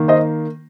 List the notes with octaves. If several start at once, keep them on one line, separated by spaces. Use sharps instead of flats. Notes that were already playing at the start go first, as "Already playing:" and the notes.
Already playing: D#3 A#3
C5 D#5